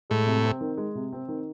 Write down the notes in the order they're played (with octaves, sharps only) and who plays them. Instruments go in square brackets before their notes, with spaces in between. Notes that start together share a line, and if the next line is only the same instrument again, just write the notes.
[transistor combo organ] A2 [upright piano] G#3
[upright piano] C3
C4
D#3
G#3
C3
C4
D#3